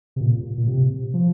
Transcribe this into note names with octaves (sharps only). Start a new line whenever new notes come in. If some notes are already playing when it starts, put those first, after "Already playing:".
C3
A#2
A#2
C3
F3